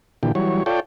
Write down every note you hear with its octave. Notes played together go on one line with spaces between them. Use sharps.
A#2 D3 E3 G4
E3 F#3 G3 C#5
F4 A4 C#5 D5 G5